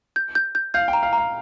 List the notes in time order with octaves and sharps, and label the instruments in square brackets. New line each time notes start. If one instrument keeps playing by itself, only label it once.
[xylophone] G6
G6
G6
[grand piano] F5 [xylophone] G6
[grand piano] G5
[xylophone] A#5
[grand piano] F5
[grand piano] F5 [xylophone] A#5